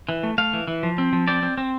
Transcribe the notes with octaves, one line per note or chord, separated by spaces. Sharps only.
E3
A3
A3 F5
E3
E3
F3
C4
F3
C4 D5
C4
C4